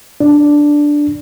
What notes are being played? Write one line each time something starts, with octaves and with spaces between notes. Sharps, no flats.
D4